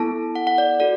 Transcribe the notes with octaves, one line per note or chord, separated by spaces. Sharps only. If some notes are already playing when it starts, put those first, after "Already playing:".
Already playing: B3 E4 A4 A5
F#5
F#5
D5
F#4 A4 D5